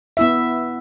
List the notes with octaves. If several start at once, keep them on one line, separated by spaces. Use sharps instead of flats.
B3 E4 E5